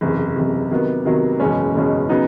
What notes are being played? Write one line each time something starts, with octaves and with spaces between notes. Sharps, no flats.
F#1 E2 C3
F#1 E2 C3
C3 D#3 F#3 B3
C3 D#3 F#3 B3
F#1 E2 B2 G#3 C#4
F#1 E2 B2 G#3 C#4
C#3 F#3 B3 D#4